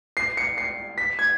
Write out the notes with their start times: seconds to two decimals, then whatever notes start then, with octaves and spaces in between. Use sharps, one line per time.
0.17 C7
0.37 C#7
0.58 C7
0.98 B6
1.19 G#6